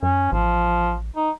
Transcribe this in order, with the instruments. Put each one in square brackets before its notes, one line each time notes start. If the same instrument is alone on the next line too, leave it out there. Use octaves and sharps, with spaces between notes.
[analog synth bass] F#2 [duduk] C#4
[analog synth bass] A1 [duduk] F3
[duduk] D#4